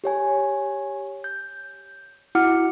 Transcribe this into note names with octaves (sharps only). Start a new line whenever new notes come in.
G4 C#5 G#5
G6
E4 F#4 F#5 D6 F6 C#7